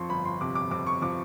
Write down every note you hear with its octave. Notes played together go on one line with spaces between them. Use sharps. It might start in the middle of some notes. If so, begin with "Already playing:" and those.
Already playing: F2 F3 C6 C#6
G1 B5
C6
C3 D6
D6
F2 D6
C#6
F3 D6